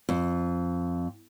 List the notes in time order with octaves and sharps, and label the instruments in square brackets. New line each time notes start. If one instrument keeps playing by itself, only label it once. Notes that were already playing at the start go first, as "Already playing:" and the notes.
[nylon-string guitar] F2